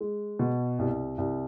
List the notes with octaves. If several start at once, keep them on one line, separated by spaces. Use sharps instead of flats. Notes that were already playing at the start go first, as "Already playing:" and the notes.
G#3
B2
C2
C2